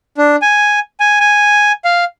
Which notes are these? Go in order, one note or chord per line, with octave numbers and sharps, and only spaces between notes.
D4
G#5
G#5
G#5
F5